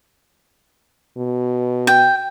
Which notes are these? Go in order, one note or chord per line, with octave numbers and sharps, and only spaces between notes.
B2
G5